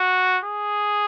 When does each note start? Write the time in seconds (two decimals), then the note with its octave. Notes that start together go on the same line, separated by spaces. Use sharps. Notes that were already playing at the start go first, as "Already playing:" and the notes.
Already playing: F#4
0.44 G#4